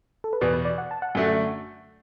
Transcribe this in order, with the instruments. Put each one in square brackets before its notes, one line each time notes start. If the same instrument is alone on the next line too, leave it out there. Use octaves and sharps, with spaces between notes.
[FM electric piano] A4
B4
[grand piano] E2 B2 B3 [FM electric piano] D5
[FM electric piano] B4
D5
F#5
A5
F#5
[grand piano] F#2 D3 A3 D4 F#4